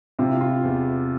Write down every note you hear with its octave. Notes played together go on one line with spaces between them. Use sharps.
C3 F4
E4
F4
E2